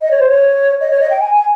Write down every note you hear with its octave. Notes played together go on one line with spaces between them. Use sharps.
D#5
C#5
C5
C#5
D#5
C#5
D#5
G5
G#5
G#5